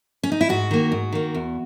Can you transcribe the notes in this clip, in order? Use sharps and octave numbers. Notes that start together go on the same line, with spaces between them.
C#4
D#4
E4
G#2 F#4
D#3 A#3
G#2
D#3 A#3
E2